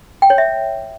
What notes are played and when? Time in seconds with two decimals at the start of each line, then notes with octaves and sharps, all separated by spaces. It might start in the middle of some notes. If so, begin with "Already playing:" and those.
0.22 G5
0.30 C#5
0.38 E5